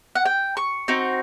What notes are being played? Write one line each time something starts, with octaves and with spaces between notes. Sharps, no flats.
F#5
G5
C#6
C4 D#4 F#4